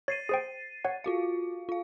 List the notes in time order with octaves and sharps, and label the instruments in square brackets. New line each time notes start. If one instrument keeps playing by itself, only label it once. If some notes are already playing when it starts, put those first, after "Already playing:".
[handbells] C#5 [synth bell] A6 C7 D#7
[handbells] G#4 C5 G5
C#5 F#5
[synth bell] F4 F#4 F5
F4 F5